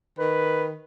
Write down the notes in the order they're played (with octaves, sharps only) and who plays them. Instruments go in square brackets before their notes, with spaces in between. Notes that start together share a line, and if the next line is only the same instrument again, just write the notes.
[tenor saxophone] D#3 [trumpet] B4